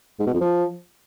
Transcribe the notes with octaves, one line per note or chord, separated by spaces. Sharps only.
G#2
B2
F2
F3